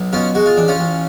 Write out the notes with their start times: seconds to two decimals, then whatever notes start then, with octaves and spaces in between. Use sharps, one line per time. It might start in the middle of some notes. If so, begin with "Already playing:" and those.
Already playing: B1
0.13 B2 C#4 F4
0.35 G#3 F#4
0.46 F4
0.57 A1 D4
0.68 C#4 F4
0.79 A1